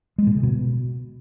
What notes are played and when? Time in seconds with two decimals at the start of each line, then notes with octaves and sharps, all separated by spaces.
0.18 G#3
0.27 A#2
0.35 C#3
0.43 B2